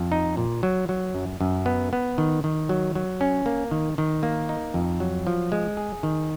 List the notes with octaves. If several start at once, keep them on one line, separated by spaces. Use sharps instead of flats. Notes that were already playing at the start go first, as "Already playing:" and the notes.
Already playing: F2
D#4
A#2
F#3
F#3
F#2
F#2
B3
B3
D#3
D#3
F#3
F#3
C#4
A#3
D#3
D#3
A#3
D#4
F2
F#3
F3
G#3
G#4
D#3